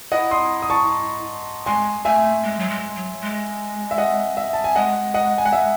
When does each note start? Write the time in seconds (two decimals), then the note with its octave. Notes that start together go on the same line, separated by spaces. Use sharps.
0.12 E4 D#5 F#5
0.31 C6 D#6
0.62 D#6
0.70 A5 C#6
1.66 G#3 G#5 C6
2.05 A3 E5 G#5
2.44 G#3
2.59 F#3
2.69 G#3
2.95 F#3
3.21 G#3
3.91 E5
3.98 D#5 F#5
4.37 E5
4.53 A5
4.64 G#5
4.76 G#3 D#5 F#5
5.14 D#5 F#5
5.38 G#5
5.45 F#5
5.53 E5